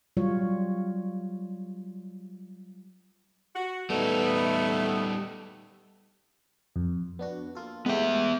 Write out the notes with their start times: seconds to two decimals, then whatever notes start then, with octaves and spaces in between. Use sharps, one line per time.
0.17 F#3 G3 F4 C#5
3.56 F#4
3.90 G3 A3 B3 D#4
6.76 F2
7.19 B3 D4 F#4
7.55 A#3 F4 A4
7.86 G#3 A3 B3 G4 E5